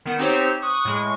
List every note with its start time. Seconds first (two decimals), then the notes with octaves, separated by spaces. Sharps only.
0.05 D#3 B3 F#5 E7
0.19 C4 D#4 G4 C5 C#5
0.62 C#6 D#6 F#6
0.85 A2 G#3 C#6